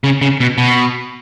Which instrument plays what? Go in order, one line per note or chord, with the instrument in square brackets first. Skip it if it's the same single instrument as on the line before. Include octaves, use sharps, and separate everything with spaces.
[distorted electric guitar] C#3
C#3
B2
B2